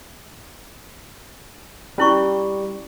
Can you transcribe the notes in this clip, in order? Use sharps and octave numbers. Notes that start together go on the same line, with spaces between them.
G3 C#4 E4 C#6